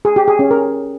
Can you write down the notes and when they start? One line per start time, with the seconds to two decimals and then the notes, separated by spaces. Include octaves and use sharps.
0.05 G#4
0.16 G4
0.28 G#4
0.39 C#4
0.51 A#4